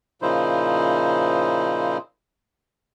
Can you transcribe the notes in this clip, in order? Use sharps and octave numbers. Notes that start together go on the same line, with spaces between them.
A#2 C#3 F3 D#4 E4 C5